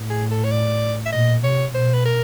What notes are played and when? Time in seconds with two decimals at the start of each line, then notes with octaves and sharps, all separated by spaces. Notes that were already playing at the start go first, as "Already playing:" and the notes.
Already playing: A2
0.10 G#4
0.31 A4
0.44 C#5
0.51 D5
1.06 E5
1.12 A#2 D#5
1.44 C3 C#5
1.74 B2 C5
1.94 B4
2.05 A#4